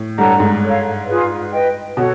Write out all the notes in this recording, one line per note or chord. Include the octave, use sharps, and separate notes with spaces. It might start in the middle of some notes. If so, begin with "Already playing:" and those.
Already playing: A2
G2 A4 C#5 F#5 A#5
G#2
A4 C#5 F5
F4 G#4 B4
B4 D#5 G5
B2 F#4 A4 C#5 F#5